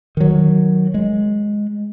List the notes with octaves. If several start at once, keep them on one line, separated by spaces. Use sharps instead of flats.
D#3 F#3
G#3